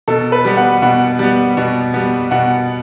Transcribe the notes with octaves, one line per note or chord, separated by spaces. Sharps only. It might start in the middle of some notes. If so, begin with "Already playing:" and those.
B2 A4
B4
G3 B3
F#5
B2 F#5
G3 B3
B2
G3 B3
B2 F#5